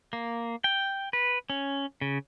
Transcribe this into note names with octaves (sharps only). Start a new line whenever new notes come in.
A#3
G5
B4
C#4
C#3